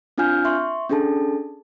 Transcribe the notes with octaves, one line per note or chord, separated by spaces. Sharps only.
C4 D4 F4 G#5 F6 G6
E5 C6 C#6
C#4 D4 G#4 A4 A5